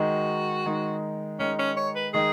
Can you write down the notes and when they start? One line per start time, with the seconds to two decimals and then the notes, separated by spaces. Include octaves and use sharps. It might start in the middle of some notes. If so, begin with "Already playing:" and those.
Already playing: D#3 G#3 D#4 F#4
0.66 D#3 G#3 D#4
1.39 D#3 G#3 C#4 D#4
1.59 C#4
1.76 C#5
1.95 B4
2.13 D#3 G#3 D#4 G#4